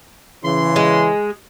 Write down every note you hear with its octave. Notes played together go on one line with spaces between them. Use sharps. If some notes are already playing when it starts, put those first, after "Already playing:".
C#3 E3 C6
G#3